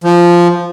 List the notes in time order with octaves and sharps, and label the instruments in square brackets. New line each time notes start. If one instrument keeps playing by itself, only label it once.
[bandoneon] F3